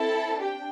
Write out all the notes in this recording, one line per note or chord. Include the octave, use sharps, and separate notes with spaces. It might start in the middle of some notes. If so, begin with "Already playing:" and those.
Already playing: C4 E4 A4 A5
D4 G4 G5